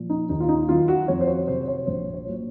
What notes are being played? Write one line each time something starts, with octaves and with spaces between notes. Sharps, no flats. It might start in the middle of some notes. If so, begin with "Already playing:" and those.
Already playing: A#2 F3
D#4
D#2 D#4
F4
D#4
D#3 F#3 F4
F#4
F2 C#5
C5
C#5
C3 F#3 C5
C#5
A#1 C5
C#5
A#2 F#3